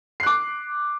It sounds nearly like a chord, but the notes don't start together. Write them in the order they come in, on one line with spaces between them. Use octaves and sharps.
C7 F#6 D6